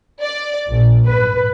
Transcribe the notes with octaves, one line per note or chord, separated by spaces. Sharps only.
D5
A#1
B4